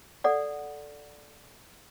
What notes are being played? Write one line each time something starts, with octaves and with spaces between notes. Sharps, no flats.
A4 D5 F#5